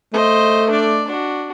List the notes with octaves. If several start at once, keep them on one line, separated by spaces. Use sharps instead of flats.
A3 C5 D#5
D4 D5
D4 F#4